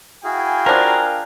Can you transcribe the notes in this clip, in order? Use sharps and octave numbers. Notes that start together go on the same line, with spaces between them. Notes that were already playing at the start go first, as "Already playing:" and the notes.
E4 F#4 G#4 F5 G5 G#5
F3 D4 A#4